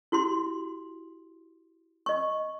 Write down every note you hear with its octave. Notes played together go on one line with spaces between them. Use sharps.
E4 F#4 G4 C6
D#5 C#6